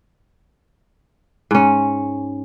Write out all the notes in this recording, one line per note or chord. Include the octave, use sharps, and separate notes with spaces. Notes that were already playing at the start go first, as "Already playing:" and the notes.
G#2 C#4